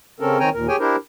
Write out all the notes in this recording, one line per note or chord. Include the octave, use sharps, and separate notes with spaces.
C#3 C4 C#4 A4 A#4
D#3 C4 C#5 G5 G#5 A#5
D#2 A#2 A#4
G4 G#4 C#5 G5 G#5
D4 E4 G4 A#4 C5